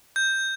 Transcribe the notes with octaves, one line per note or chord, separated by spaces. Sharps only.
G6